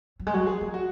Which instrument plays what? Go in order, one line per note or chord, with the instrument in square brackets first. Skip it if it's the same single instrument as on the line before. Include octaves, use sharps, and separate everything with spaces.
[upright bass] F#3
G#3
F#3
[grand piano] G#4
[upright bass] G#3
[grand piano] F#4